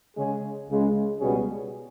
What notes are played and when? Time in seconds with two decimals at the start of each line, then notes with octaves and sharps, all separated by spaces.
0.16 C#3 G#3 C#4 G#4
0.68 C#2 C#3 G#3
1.20 C#2 B2 G3 C#4 G#4